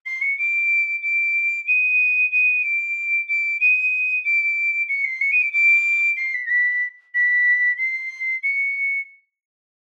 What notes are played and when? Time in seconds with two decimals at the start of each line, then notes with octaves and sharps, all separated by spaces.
0.05 C7
0.21 C#7
0.37 D7
1.02 D7
1.67 D#7
2.31 D#7
2.62 D7
3.28 D7
3.60 D#7
4.24 D7
4.88 C#7
5.04 C7
5.21 C#7
5.31 D#7
5.42 D7
5.52 D7
6.16 C7
6.34 B6
6.45 A#6
6.49 B6
7.14 B6
7.77 C7
8.43 C#7